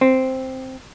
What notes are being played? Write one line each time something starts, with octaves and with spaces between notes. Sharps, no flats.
C4